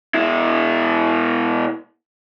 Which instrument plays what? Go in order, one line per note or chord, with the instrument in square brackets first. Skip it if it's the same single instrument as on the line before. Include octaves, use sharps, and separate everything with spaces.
[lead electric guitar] B2 E4